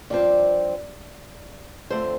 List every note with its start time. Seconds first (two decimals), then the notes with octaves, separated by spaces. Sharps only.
0.10 G2 F3 C4 D5
1.90 F2 D3 A3 C4 C5